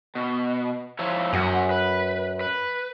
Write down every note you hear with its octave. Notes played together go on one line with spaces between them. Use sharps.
B2
F3 E4 C#5
F#2 G#4 F#5
B4
B4